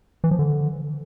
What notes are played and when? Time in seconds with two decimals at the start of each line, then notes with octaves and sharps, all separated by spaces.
0.24 E3
0.31 F3
0.39 D3